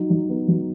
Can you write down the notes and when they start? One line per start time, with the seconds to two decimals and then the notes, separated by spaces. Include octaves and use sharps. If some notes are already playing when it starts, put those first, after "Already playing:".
Already playing: F#3 D#4
0.10 F#3
0.29 B3
0.48 F#3